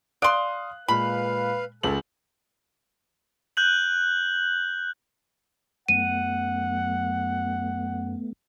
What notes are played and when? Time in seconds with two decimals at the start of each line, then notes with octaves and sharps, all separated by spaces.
0.22 D5 F5 C6 D#6 F#6
0.88 A#2 G#3 B4 F5 B5
1.83 C#2 A4 F#7
3.57 F#6 G6 F#7
5.88 F#2 A3 B3 F#5 D#7